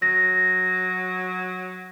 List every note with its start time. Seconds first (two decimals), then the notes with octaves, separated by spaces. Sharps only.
0.02 F#3 A#6